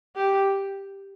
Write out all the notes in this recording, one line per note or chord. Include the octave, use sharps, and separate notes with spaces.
G4